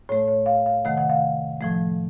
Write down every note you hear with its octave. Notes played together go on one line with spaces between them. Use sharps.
A2 A3 C#5
C#5
F5
F5
C3 D#3 A3 F#5
F#5
F5
A2 F3 A3